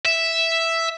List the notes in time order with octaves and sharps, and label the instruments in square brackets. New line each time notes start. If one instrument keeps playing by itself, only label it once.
[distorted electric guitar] E5